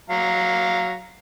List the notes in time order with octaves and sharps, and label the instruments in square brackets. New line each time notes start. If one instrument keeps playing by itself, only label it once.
[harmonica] F#3 F5 A#5